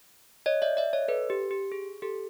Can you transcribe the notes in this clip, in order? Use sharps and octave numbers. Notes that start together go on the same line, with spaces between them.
C#5 D#5
D5 E5
D5 E5
C#5 D#5
A4 B4
G4
G4
G#4
G4 A4